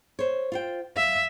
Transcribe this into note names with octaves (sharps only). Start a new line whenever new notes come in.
C5 C#5
F4 C5 G5
E5 F5